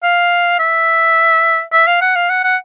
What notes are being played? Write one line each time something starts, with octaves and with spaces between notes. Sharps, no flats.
F5
E5
E5
F5
F#5
F5
F#5
F#5